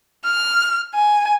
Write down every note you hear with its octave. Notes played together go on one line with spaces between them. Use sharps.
F6
G#5